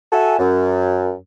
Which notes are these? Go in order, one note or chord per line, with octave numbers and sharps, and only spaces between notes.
F#4 A4 E5 G#5
F#2